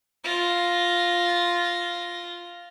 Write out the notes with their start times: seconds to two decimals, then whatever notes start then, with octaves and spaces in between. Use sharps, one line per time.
0.24 F4 A#6